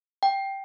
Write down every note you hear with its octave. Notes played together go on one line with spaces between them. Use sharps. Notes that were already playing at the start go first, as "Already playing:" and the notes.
G5